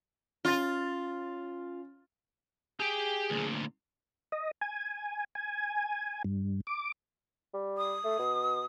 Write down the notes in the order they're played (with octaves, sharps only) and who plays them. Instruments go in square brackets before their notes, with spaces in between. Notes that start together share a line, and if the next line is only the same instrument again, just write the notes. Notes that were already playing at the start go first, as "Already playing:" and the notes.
[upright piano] C#4 A6 [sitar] F4
[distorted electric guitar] G4 G5 [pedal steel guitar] G#4
[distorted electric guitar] D2 A#2
[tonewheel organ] D#5
G#5
G#5
G2
D6
[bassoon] G3
[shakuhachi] D#6
[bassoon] A3
B2